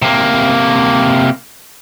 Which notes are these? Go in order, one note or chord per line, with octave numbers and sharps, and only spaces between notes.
C3 A#3